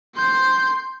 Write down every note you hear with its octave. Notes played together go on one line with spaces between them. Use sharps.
C6 G6